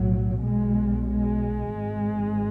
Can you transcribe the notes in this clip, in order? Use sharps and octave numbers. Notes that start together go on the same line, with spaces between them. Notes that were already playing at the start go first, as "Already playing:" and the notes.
Already playing: B1 A2 F#3
B1 B2 G#3
G#3
G#1 G#2